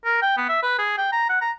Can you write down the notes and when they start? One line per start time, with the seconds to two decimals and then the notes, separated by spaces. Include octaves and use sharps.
0.05 A#4
0.22 G5
0.37 B3
0.49 E5
0.63 B4
0.79 G#4
0.98 G5
1.12 A#5
1.29 F#5
1.41 A#5